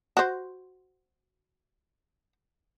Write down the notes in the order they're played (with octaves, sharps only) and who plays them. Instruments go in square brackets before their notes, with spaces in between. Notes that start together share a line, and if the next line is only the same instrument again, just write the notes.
[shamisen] F#4 C5